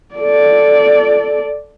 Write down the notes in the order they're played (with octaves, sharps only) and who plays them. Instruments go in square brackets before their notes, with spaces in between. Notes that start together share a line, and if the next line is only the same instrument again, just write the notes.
[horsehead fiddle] A4 D5